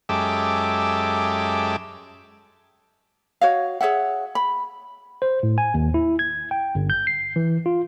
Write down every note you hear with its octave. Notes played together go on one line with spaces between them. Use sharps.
F#2 G#3 G4 A4 E5 D6
F#4 C#5 D#5 F5
G#4 C#5 E5 F#5
B5
C5
A2
G#5
D#2
E4
G#6
G5
G1
G6
C7
E3
F4